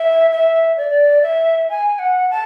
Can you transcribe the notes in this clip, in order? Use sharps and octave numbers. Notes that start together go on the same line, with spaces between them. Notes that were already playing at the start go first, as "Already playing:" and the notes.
Already playing: E5
E5
D5
E5
G#5
F#5
A5